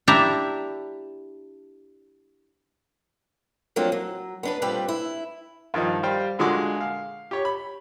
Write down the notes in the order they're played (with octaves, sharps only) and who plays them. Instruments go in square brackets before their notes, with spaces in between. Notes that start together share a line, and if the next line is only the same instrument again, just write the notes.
[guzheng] D4 E4 G4 E5 A#5
[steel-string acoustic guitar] F3 F#3 A#3 C4 D4
F#3
B3 D4 B4
A#2 G3 C4 B4 D5
E4
[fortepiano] G2 D#3 F3 D#4
G3 C5 F5 G5
A#2 D3 G#3 F#4 C6 D6
F5
G4 C#5
B5